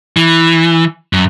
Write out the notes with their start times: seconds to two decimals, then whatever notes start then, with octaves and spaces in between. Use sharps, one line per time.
0.17 E3
1.13 F#2